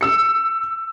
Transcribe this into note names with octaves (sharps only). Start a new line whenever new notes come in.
E6 C#7